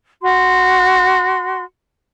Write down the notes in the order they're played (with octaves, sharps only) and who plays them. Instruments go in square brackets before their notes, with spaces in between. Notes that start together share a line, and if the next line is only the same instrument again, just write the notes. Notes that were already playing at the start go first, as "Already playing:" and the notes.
[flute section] F#4 C6